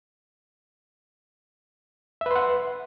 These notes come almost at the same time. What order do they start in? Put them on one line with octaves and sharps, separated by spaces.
E5 B4 C6 F#5